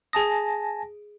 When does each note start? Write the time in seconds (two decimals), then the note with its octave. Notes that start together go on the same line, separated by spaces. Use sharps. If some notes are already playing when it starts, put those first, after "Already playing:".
0.13 G#4 G#5 A5 D#6 A#6